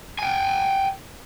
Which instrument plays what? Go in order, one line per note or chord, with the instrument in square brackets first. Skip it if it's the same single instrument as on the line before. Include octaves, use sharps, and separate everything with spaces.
[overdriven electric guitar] G5 G#5